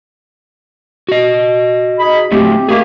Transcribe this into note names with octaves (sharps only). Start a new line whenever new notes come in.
F#4 D#5
D#4 G#4 B5
F#3 A3 C4 G4
D#3 A3 A#3 G4 G#4